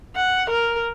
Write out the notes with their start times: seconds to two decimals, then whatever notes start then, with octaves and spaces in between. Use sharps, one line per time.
0.16 F#5
0.50 A#4